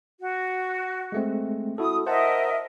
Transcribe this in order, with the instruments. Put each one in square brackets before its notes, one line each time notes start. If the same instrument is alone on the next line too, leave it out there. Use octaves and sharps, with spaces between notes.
[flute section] F#4
[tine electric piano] G#3 A3 C4
[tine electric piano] E4 F#4 A4 [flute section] D#6
[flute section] A#4 D#5 E5 [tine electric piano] C5 F#5 A5